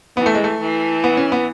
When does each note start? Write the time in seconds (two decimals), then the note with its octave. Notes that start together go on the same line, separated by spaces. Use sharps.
0.17 E3 B3
0.26 A3
0.35 G#3
0.44 A3
0.60 E3
1.04 B3
1.17 C#4
1.32 B3